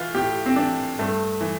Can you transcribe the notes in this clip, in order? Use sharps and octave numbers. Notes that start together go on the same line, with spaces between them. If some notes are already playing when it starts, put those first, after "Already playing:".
Already playing: A2 E3 F4
A2 G4
C4
E3 D4
G2 A3
E3